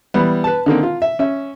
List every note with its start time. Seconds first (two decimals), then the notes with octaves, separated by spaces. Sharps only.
0.14 E3 G3 B3
0.44 B4 A5
0.66 D3 D#3 A#3 C4
0.83 F4
1.02 E5
1.19 C#4 E5